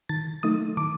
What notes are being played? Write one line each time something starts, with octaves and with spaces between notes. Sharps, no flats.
D#3 A6
F#3 A3 D#4 D#6
D#3 D6